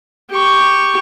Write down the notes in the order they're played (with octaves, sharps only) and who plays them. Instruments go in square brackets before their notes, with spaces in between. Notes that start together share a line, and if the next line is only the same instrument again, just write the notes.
[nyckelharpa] G4 C#6